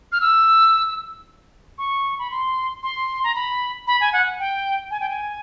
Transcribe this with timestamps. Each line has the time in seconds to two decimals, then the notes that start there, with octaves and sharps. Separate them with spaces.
0.12 F6
0.21 E6
1.78 C#6
2.19 B5
2.31 C6
2.83 C6
3.24 A#5
3.35 B5
3.87 B5
4.01 G#5
4.13 F#5
4.39 G5
4.91 G#5
5.00 G5
5.10 G#5